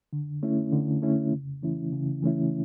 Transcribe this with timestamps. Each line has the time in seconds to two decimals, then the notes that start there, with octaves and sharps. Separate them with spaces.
0.13 D3
0.43 A3 C#4 E4
0.72 D3
1.02 A3 C#4 E4
1.33 C#3
1.63 E3 A3 C#4 E4
1.93 C#3
2.23 E3 A3 C#4 E4